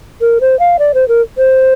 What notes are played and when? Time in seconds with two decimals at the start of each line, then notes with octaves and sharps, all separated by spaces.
0.21 A#4
0.41 C5
0.59 F5
0.79 D5
0.94 C5
1.08 A#4
1.38 C5